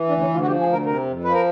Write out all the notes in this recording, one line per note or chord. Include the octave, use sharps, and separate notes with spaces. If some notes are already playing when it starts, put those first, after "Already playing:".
Already playing: E3
D2 D4
C#4
D2
F4
F#4
F3 G4
G#4
D2
A#4
C3 A#4
F2
F3 B4
A#4